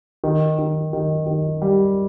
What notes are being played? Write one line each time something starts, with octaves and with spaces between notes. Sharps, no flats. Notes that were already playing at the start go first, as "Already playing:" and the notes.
D#3
D#3
D#3
D#3
G3